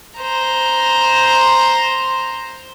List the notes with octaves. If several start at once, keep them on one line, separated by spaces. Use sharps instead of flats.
C5 A#5